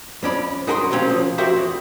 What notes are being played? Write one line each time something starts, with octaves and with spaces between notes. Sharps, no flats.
F2 C#4 D5 B5
F#2 F#4 G#4 A#4 B5 C6
D2 C3 F#3 C#4 F5
F3
F#4 G4 A#4 C5 E5 F5
E2